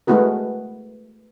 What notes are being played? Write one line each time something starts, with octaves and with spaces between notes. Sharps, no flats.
G#3 A3 B3 E4 F#4 A#4